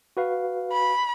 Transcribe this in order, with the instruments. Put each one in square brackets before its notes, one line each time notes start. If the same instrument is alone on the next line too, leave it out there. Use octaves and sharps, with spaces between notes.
[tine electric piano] F#4 B4 F5
[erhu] B5